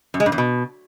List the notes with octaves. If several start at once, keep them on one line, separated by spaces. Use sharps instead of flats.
F#2
G#3
G2
E2
B2